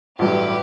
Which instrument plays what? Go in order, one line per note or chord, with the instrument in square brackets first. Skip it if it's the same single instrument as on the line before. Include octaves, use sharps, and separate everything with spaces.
[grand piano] A1 G2 F#3 [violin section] G4 B4